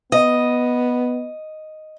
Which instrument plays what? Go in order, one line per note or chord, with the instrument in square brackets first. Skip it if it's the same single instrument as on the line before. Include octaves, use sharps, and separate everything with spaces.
[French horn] B3 [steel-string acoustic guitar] D#5